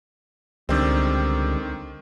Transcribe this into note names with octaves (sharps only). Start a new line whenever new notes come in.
C#2 D3 D#3 G3 C4